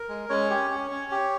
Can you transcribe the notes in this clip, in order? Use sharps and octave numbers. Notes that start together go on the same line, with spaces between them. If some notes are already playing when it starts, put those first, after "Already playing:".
Already playing: A#4
G#3
G#3 C#4 C#5
G4
C#4
C#4
G4